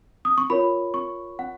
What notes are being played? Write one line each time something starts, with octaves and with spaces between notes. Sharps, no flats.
D#6
C#6
F4 A#4 C#5 B5
C#6
F#5